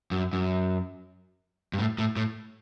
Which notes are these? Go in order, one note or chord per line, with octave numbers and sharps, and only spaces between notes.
F#2
F#2
G2
A2
A2
A2